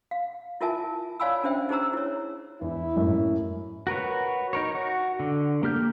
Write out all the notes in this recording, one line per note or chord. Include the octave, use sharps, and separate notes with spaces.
F5
E4 F4 A#4 E5 G#5 A5
C#5 D5 F5 G#5 B5 E6
C#4 D4 C5 E5 G5
D#4 G#4 C5 A#5 E6
E4 C#5
E2 E4
F#2 A2
F#4 A#4 B4 C#5
D#4 A#4 C#5
F#4
D3
A#3 G4 F6 G6